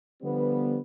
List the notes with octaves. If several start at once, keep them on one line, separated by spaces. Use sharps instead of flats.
D3 F3 G3 B3